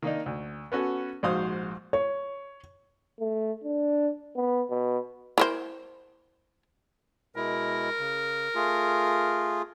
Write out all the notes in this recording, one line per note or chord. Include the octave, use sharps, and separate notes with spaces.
D#3 A#3 D4 D#4
D2
B3 C#4 F#4 A4
A#1 G#2 F#4 C5 F5 D#6
C#5
A3
D4
B3
B2
E4 A#4 C5
B2 G#3 E4 A#4
C#3
A3 F4 G#4